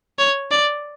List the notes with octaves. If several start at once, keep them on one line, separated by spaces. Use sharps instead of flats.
C#5
D5